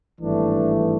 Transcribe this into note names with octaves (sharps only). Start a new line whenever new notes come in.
G#1 G2 E3 A3 D4